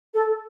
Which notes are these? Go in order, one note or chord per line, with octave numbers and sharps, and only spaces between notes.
A4